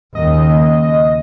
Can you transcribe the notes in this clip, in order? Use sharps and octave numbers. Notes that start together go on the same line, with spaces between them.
D#2 C#3 D#5